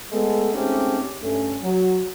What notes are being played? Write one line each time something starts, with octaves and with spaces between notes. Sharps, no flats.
G#3 A3 B3
G#3 A3 C4 C#4 D#4 G4
G2 A3 C#4
F#3